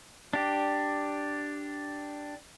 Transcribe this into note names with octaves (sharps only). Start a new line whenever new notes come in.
D4 G4